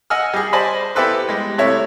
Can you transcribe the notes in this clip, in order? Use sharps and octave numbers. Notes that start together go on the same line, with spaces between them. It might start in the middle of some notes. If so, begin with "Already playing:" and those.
D#5 F#5 G#5 E6 F6
G3 G#4
C5 D5 D#5 G#5 A5 B5
B3 E4 G4 A4 B4 C5
G3 G#3
C3 A3 E4 C#5 E5